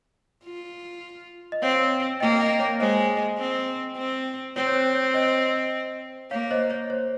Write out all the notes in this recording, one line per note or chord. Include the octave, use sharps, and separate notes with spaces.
F4
D#5
C4 C#5 F5
A#3 D#5 G5
D#5 G5
C#5 F5
G#3 C5 D#5
C4
C4
C4 C#5
C#5
C5
C#5
C5 D#5
A#3 C#5 F5
C5 D#5
C#5
C5